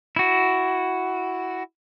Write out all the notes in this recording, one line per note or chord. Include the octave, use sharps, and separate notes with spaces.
E4 F#4